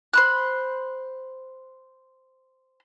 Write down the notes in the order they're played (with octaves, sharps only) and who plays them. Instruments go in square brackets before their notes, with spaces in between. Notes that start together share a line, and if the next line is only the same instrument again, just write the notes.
[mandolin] C5 B5 F#6